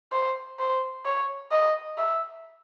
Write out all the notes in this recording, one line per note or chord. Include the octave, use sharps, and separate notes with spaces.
C5
C5
C#5
D#5
E5